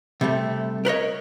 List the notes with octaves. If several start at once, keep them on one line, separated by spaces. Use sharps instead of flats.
C3 G3 A3
A#4 B4 C#5 D#5